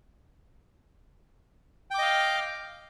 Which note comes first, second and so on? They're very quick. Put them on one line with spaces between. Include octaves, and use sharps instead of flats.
G5 D6 D#5 F5